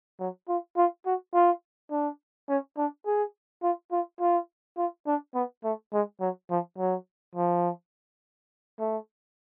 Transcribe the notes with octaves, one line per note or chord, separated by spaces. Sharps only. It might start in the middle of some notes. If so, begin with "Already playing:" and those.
F#3
F4
F4
F#4
F4
D4
C#4
D4
G#4
F4
F4
F4
F4
D4
B3
A3
G#3
F#3
F3
F#3
F3
A3